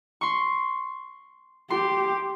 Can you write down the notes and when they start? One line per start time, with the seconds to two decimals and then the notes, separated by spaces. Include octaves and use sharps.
0.21 C6 C#6
1.70 G4 C6